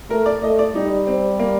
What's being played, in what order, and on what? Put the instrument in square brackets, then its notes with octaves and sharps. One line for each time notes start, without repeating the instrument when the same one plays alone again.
[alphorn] A3 [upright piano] A#4
[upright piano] D5
[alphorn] A3 [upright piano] D#5
[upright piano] D5
[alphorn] G3 [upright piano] D#4
[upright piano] C4
A#3